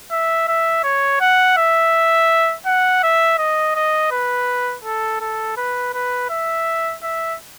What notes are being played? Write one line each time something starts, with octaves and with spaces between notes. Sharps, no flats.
E5
E5
C#5
F#5
E5
F#5
E5
D#5
D#5
B4
A4
A4
B4
B4
E5
E5